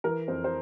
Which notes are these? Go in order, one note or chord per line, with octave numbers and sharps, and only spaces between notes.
E3 A#4
F2 C5
C5